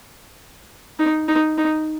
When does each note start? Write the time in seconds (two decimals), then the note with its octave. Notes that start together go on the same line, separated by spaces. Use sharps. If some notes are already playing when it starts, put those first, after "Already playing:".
0.99 D#4
1.28 D#4
1.58 D#4